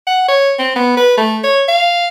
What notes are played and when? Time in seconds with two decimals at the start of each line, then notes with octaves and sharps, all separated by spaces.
0.07 F#5
0.28 C#5
0.59 C4
0.76 B3
0.97 B4
1.18 A3
1.44 C#5
1.69 F5